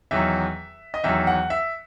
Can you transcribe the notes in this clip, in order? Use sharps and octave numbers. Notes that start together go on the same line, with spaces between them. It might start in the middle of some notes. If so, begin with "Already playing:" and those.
E2 D#3 F#3 E5
D#5
E2 D#3 F#3 E5
F#5
E5